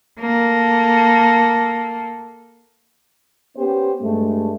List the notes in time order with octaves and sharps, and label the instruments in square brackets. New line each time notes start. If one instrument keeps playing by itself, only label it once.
[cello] A#3 A4
[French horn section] B3 C#4 G4 C5
G2 G#3 A3